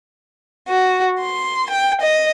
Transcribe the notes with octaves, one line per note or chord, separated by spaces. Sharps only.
F#4
C6
G5
D#5